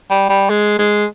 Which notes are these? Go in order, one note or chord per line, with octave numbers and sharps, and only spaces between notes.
G3
G3
G#3
G#3